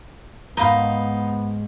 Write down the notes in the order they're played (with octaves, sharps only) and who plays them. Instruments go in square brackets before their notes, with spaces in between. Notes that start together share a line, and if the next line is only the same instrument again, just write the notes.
[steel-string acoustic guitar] G#2 [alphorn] B3 [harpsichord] D#4 F5 [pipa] A#4 B4